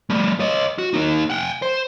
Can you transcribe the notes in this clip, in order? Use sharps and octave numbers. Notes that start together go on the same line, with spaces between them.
G3 A3
C#5 D#5
F#4
A#3 D#4
F#5 G5
C5